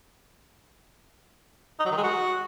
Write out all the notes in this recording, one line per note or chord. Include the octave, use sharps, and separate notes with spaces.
D#4
F#3
D#3
G#3
F#4